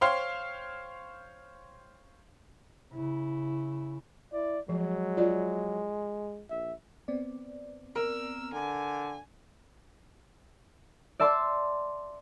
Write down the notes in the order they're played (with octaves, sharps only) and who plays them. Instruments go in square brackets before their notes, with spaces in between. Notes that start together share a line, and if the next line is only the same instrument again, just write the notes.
[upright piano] C5 C#5 F5 G5 C6
[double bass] C#3 E4
[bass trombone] E4 [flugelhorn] D5
[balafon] F3 [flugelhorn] F#3 [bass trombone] G#3
[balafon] F4 D5
[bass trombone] A#1 [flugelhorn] E5
[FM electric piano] B3 C4 D5
[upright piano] A#4 [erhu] E6
[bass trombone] D3 [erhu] G#5
[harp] D5 E5 A5 C6 D6